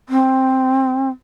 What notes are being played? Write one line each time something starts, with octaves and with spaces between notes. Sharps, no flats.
C4